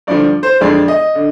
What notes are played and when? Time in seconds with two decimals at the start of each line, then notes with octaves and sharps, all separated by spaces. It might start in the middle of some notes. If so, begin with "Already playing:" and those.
0.07 G2 D3 F3 D5
0.43 C5
0.61 F2 D3 F3 G#3 D5
0.88 D#5
1.15 D3